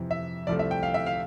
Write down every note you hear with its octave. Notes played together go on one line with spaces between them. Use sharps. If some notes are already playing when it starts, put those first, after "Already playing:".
Already playing: F2 C3 E3
E5
C2 C3 F3 A3 D5
E5
G5
F5
E5
F5